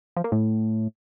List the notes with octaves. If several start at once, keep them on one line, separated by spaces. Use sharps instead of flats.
F3
A#3
A2